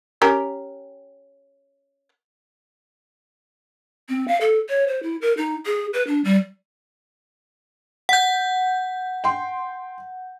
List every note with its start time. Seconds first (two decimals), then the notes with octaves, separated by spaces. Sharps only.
0.22 C#4 G4 A#4
4.09 C4
4.28 F5
4.41 A4
4.69 C#5
4.88 C5
5.03 E4
5.21 A#4
5.37 D#4
5.66 G#4
5.93 B4
6.07 D4
6.24 G3
8.09 F#5 G6
9.24 G5 C6